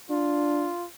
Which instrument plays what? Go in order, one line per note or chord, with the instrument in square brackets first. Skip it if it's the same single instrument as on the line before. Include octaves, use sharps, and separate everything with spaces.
[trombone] D4 [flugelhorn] F4